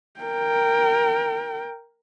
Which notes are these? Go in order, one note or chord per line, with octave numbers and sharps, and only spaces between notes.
A#4 G5